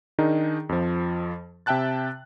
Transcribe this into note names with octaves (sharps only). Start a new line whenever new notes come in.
D#3 D4 D#4 G#4 A#4
F2 F3
C3 E5 G5 A5 F#6 A6